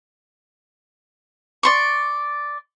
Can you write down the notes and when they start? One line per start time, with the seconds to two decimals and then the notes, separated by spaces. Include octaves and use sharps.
1.63 D5 C6 C#6